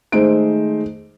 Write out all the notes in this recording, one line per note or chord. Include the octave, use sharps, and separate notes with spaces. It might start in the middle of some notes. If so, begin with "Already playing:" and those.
D#3 G#3 A3 D#4 C5 D7